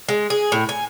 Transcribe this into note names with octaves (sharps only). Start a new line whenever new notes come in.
G#3
G#4
A2
G#5